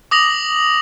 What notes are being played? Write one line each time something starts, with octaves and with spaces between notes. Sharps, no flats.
D6 D#6 A#6 F7 F#7